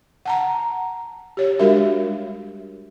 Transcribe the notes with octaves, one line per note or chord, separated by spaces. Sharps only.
F#5 A5 A#5
G4 C#5
G3 G#3 D4 F#4 A#4 E5